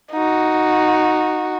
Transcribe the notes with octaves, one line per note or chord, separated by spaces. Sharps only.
D#4 F#4